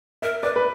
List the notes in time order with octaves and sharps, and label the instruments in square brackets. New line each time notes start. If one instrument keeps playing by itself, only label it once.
[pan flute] A#4 [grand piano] E5
[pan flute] B4 [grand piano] D5
[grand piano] B4